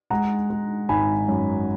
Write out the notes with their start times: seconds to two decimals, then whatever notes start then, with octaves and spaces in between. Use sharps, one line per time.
0.10 G#3 F#5 A#5
0.50 G#3
0.89 G#1 G#5 B5
1.28 F#2